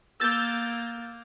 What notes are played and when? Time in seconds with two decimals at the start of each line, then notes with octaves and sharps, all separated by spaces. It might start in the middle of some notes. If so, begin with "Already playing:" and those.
0.20 A#3 E6 G6 A6